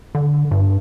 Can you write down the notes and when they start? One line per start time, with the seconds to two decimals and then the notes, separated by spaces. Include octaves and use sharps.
0.15 D3
0.51 G2